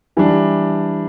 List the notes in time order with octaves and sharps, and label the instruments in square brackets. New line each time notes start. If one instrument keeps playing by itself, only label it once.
[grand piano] E3 G3 D4